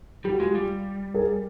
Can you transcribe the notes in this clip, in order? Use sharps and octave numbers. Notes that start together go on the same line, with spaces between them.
G3 G4
F#4
G#3 F4 G4
G3
G#4 A#4